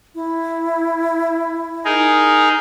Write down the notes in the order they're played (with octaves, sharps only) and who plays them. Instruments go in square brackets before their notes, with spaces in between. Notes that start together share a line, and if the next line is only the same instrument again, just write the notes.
[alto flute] E4
[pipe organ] D#4 G#4 A#4